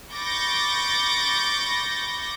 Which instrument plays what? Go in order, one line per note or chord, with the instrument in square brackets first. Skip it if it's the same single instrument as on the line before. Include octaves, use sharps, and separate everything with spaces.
[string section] B5 C#6 D6 G6 A6 A#6